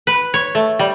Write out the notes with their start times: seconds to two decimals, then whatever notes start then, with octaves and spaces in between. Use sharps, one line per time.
0.07 B4
0.34 C#5
0.55 A3
0.79 G3